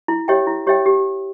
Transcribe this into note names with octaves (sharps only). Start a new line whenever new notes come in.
E4
G4 C#5 E5 G5
E4
G4 C#5 E5 G5
G4